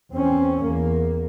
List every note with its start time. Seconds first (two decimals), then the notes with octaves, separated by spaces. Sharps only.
0.11 E2 C4 C#4
0.63 E2 A#3